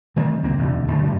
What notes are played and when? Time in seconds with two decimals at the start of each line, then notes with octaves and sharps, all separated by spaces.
0.16 D#3 G3 A3 C4
0.43 C#2 A#3 C4
0.58 E1 D2
0.87 D1 D2 G#2 A3
1.04 F#2 A3